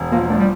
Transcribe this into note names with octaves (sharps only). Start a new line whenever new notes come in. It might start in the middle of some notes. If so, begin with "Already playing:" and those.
Already playing: E1
F3 A#3
A3 D4
G3